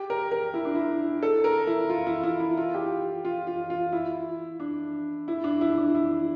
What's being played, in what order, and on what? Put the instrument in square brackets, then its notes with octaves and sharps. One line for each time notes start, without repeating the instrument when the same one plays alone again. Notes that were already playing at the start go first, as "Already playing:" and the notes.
Already playing: [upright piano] G4
A#4
A#4
E4
D4
E4
A4
A#4
E4
F4
E4
E4
E4
F4
G4
F4
F4
F4
E4
D4
E4
D4
E4
D4
E4